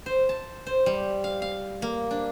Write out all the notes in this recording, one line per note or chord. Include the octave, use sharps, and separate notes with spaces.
C5
A5
C5
G3
F5
F5
A#3
D4